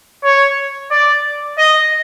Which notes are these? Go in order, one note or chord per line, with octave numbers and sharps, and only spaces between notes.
C#5
D5
D#5